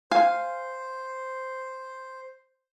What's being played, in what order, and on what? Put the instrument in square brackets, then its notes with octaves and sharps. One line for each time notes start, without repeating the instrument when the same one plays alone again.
[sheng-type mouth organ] C5 [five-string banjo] F5 G#5